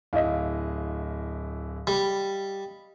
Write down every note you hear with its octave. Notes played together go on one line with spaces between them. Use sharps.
D1 E4 D#5 F5
G3 B5